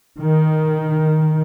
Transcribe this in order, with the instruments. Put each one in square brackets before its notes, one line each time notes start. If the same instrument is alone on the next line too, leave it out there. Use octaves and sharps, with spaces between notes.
[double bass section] D#3